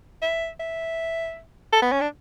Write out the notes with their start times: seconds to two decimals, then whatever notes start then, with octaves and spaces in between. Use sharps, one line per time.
0.22 E5
0.60 E5
1.73 A4
1.82 B3
1.92 C#4
2.01 D4